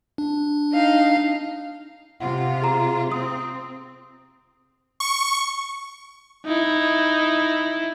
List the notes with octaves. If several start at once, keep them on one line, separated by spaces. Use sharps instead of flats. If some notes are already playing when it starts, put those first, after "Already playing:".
D4
D#4 F5
C3 F4 F#5
G#4 A#5
C4 D#6
C#6
D#4 E4